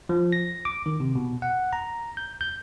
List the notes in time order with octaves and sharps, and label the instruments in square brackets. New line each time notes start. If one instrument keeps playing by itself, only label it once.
[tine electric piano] F3
A#6
D6
D#3
C3
B2
F#5
A#5
G6
G6